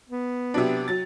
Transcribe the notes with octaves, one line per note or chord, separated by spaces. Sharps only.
B3
C3 F#3 D4
F#3 A6